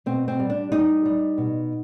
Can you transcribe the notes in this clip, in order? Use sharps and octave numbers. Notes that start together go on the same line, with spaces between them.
B2 C4
C4
G3
D4
G3 D#4
G3
B2